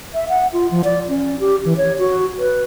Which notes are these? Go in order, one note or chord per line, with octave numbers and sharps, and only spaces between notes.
E5
F#5
F4
F3
D5
C#4
G4
E3
C#5
F#4
B4